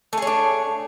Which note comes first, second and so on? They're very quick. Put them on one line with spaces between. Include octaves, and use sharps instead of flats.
A3 G#4 C#5 D4